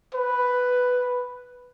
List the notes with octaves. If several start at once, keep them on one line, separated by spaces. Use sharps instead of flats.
B4